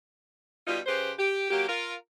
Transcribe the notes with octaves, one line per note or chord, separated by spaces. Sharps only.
B2 G3 D#4 F4
C#3 G4 B4 C5
G4
F#3 A#3 G4
F4 A#4